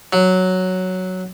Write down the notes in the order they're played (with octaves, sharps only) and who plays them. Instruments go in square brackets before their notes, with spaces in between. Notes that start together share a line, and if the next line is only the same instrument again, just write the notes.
[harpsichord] F#3